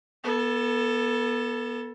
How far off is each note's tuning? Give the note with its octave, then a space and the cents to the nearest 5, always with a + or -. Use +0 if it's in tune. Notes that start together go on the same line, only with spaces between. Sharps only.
B3 -25 A4 +10